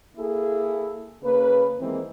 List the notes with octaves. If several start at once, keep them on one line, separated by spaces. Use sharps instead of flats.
A#3 E4 G#4 A4
C#3 A#3 B4
D#2 E3 G#3 A#3 C4